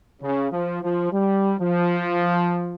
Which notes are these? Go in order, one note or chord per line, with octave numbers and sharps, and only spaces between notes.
C#3
F3
F3
G3
F3